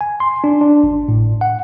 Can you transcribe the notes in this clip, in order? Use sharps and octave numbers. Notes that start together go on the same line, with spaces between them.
G#5
C6
D4
D4
G#1
A2
F#5